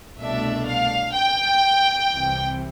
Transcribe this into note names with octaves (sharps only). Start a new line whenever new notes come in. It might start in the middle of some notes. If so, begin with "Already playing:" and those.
C2 B2 A3 D4 E5
F5
G5
C2 C3 E3